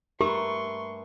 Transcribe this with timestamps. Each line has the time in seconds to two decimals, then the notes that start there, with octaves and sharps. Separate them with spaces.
0.21 G2 A3 G4 A#4 C6 C#6